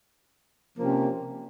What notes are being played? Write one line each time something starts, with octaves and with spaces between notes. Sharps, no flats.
C3 F3 A#3 C#4 G4